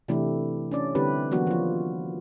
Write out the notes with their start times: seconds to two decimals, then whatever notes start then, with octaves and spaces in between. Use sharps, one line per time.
0.08 C3 E3 A3 D4 E4 G4
0.71 C#4 D4 D5
0.95 D3 G3 C4 E4 G4 B4
1.31 E3 F#3 A#3 B3 D4 F#4
1.47 F3 F4